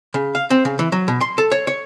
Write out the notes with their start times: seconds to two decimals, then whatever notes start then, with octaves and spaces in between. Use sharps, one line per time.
0.14 C#3
0.35 F5
0.50 C4
0.65 C#3
0.79 E3
0.92 F#3
1.08 B2
1.21 C6
1.38 A4
1.52 C#5
1.67 C#5